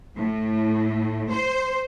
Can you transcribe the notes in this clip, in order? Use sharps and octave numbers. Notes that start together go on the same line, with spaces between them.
A2
C5